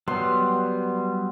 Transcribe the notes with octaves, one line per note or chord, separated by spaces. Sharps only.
F#3 G3 B3 C6